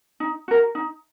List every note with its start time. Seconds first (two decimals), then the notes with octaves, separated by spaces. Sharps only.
0.20 D#4
0.48 F#4 A#4
0.75 D#4